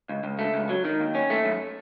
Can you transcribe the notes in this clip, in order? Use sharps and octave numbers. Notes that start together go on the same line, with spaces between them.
C#2
C#2
A3
C#2
F#3
D#3
D#2
C#4
A3
F#2